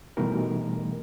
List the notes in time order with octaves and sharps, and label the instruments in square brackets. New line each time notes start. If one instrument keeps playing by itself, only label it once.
[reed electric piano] B2 E3 G3 A3 D#4 A#4